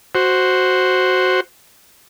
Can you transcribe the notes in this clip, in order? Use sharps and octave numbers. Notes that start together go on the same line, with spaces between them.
F#4 C5